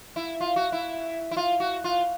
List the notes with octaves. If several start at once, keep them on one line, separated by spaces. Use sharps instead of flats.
E4
F4
F#4
E4
E4
F4
F#4
F4